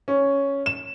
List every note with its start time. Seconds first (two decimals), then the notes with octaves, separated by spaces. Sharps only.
0.08 C#4
0.66 E7